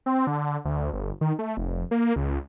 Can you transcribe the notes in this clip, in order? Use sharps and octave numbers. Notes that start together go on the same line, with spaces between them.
C4
D3
D2
G1
D#3
A3
F1
A#3
C#2